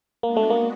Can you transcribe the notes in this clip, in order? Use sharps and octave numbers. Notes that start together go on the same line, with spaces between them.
G#3 A#3 B3 D4 F#4
A3
A#3